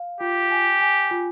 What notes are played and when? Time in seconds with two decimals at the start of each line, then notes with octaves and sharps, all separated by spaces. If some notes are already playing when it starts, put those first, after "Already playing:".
Already playing: F5
0.20 F4 G4
0.51 G#5
0.81 G#5
1.11 F4